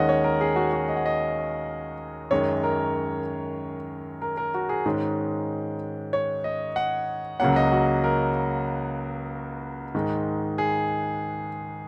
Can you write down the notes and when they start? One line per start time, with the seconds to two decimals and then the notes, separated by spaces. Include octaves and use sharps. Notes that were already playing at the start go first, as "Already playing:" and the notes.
Already playing: D#2 D#3 G#3 C#4 D#5 F#5
0.09 C#5
0.24 A#4
0.41 G#4
0.56 F#4
0.73 F#4
0.88 D#5
0.97 F#5
1.06 D#5
2.31 F#2 D#3 G#3 C#5
2.63 A#4
4.22 A#4
4.37 A#4
4.54 F#4
4.69 G#4
4.86 G#2 D#3 G#3 C#4
6.13 C#5
6.44 D#5
6.76 F#5
7.40 C#2 C#3 F#3 A#3 C#4 F#5
7.56 D#5
7.72 F#4
8.04 A#4
9.95 G#2 D#3 G#3
10.58 G#4